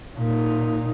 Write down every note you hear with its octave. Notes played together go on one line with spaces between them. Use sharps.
A#2 D#4